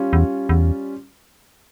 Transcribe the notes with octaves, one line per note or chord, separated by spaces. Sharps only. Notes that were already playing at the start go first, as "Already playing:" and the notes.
Already playing: G3 C#4 F4
E2
E2